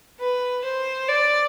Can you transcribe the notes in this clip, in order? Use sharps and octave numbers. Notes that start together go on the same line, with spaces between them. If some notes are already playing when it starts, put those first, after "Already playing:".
B4
C5
D5